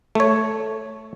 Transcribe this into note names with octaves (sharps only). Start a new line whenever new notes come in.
A3 C#5